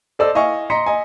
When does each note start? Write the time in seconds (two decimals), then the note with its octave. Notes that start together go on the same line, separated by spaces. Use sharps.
0.19 A4 C5 D5 D#5 E6
0.35 E4 D#5 F5 G#5 C#6
0.70 D#5 A#5 C6 B6 C#7
0.86 D#5 G#5